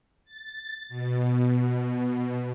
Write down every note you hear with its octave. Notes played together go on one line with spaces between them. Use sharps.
A6
B2